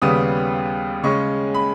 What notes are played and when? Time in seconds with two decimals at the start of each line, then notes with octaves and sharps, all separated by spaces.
0.02 D#2 C#3 G3 B3 D#6
1.03 C#3 G#3 C#4 C#6
1.54 B5